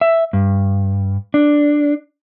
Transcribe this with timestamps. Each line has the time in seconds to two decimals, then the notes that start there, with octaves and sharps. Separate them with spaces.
0.01 E5
0.33 G2
1.34 D4